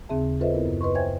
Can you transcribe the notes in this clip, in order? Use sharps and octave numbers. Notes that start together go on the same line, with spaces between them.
D#2 C#3 C4 G#4 E5 A5
F4 A4 B4 C5 D#5 E5
B3 E4 A#4
F#2
B4 D#5 C6 C#6
C5 C#5 E5 G5 G#5 G#6